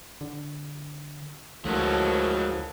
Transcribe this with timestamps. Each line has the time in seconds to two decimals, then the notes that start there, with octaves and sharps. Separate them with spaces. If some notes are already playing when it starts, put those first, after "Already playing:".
0.21 D3
1.65 D2 G#2 C#3 F3 F#3 A3 A4 A#4